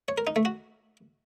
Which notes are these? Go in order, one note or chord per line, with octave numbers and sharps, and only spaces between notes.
C#5
A#4
D#4
A3
F#4